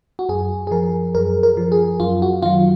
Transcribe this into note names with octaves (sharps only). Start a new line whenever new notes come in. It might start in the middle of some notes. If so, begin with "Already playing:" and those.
F#4
F#2 G#4
G#4
F3 A#4
F#2 A#4
A#4
F3
G#4
F#2 F4
F#4
D#3 F#3 F4